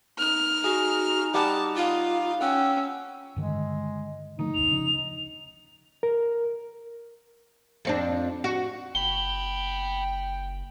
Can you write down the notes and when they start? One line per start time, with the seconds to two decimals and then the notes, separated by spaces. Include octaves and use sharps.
0.19 D#4 F6
0.64 F#4 G#4
1.34 G3 F#5 A5 D6 D#6
1.76 F4 F5
2.41 C#4 F#5 G5 E6
3.36 G2 D3 D#3 G#3
4.39 D3 F3 A3 D#4
4.54 E1 C#2 F7
4.71 C#3 F3 D4
6.03 A#4
7.85 F2 C4 D4
8.44 F#4
8.95 F#1 F#5 G5 B5 G7